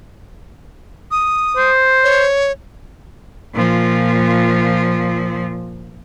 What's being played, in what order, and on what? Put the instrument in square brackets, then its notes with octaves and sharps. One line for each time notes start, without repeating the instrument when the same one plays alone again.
[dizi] D#6
[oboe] C5
[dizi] C#5
[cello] A#2 F3